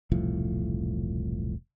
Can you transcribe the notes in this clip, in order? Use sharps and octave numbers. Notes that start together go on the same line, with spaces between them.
E1 C2 A2 F3